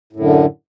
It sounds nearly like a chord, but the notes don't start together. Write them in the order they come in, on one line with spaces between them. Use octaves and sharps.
A2 F#2 D3